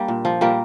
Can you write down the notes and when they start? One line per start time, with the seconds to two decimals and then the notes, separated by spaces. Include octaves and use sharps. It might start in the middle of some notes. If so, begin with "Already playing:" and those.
Already playing: G3 A#3 D4
0.08 A#2
0.25 F3
0.41 A#2 G3 A#3